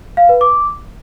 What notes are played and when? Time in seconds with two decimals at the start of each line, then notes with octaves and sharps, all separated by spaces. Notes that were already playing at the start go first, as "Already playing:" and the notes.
0.17 F5
0.29 B4
0.41 D6